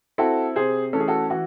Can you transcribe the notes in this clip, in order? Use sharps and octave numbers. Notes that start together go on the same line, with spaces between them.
C4 E4 F#4 A4
C3 G#4 C5
E3 A3 C#4 A4
G#4
F#4 A4
E3 F#4